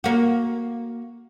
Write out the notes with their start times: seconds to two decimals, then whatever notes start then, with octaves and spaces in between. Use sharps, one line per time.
0.04 A#3 F#4